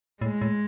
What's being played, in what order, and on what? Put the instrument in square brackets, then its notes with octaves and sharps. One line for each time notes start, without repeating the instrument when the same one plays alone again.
[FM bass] A2 [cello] G#3
[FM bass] A2